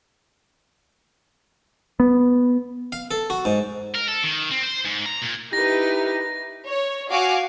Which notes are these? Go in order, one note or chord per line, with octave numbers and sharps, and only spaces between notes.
B3
F5
A4
F#4
G#2
A#4
A4
D#3
C4
C5
G#2
A#5
A#2
D#4 E4 G4 B4 A#6
C#5
F#4 F5 G#5 D6